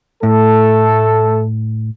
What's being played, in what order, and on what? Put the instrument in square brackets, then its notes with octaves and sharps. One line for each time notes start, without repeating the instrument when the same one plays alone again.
[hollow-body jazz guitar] A2 [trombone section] A3 A4